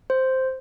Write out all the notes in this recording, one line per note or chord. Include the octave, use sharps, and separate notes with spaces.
C5